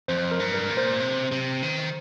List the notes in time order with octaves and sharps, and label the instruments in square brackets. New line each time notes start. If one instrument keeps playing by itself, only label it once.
[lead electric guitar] F2 [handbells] C5
[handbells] A#4
[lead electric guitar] G2
[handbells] A#4
[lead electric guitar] A#2
[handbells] C5
[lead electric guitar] C3
C3
D#3